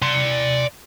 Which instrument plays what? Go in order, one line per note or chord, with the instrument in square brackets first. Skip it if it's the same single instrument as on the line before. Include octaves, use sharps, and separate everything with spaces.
[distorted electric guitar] D5 C6